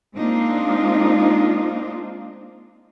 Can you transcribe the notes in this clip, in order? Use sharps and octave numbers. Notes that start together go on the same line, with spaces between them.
G#3 A#3 C4 D4 D#4 F4